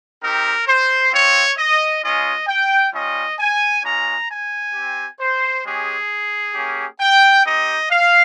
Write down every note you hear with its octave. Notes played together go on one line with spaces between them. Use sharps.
C4 D#4 G4 A#4
C5
C4 F4 C#5
D#5
G#3 C#4 F4 D#5
G5
G3 C#4 F4 D#5
G#5
G#3 C#4 F4 A#5
G#5
C4 G4
C5
G#3 C#4 G4 G#4
A#3 C#4 G4
G5
C4 D#4 G4 D#5
F5